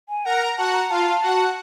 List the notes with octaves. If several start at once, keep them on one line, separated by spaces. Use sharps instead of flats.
G#5
A#4 F#5 A#5
F#4 F#5 A5
A#5
F4 F5 A5
F#4 F#5